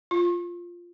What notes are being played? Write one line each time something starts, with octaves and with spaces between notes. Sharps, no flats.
F4